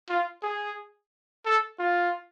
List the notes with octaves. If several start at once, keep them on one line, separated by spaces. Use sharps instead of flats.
F4
G#4
A4
F4